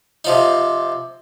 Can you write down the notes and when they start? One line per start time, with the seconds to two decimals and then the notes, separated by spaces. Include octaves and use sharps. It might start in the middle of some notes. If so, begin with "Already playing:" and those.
0.25 C3 F3 D#4